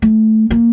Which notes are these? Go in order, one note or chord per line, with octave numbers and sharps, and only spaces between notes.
A3
A#3